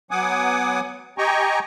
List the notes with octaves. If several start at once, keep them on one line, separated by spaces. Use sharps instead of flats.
F#3 B3 F#5 G#5 D6 D#6
G4 D#5 G5 G#5 A#5 C#6